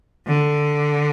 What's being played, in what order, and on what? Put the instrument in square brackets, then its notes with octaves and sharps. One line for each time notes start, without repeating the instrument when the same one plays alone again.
[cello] D3